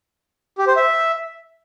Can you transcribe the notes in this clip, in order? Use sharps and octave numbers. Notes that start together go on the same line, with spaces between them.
G4
C5
E5